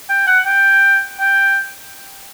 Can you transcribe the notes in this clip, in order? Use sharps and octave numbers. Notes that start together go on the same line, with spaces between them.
G5
F#5
G5
G5